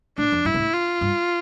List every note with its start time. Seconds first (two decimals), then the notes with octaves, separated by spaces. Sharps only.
0.18 A2 D4
0.32 F2
0.45 G2 E4
0.54 B2
0.59 A2
0.74 F4
1.01 G2